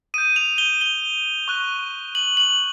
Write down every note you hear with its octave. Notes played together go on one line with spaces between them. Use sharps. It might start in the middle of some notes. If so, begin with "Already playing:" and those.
D#6 G6 D#7
F7
G7
G7
C#6 F#6
F#7
F#7